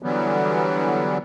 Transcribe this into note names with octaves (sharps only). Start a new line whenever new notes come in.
D3 E3 F#3 G3 B3